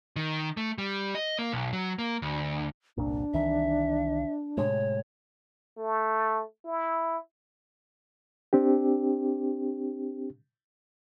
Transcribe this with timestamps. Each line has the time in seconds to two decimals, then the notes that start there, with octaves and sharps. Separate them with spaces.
0.16 D#3
0.57 A3
0.78 G3
1.15 D#5
1.39 A#3
1.52 B1
1.73 F#3
1.99 A#3
2.22 D2
2.97 G1 C2 A#2 D4
3.34 C2 D#3 E3 E5
4.57 A2 C3 G#3 C#5
5.77 A3
6.65 E4
8.53 C4 D4 G4